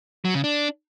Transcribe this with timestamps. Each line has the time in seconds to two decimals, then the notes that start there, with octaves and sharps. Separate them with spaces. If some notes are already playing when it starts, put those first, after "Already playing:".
0.25 F#3
0.34 C#3
0.44 D4